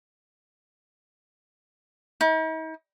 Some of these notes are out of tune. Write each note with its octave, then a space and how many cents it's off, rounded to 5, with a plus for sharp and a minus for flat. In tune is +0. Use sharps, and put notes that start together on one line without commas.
D#4 +45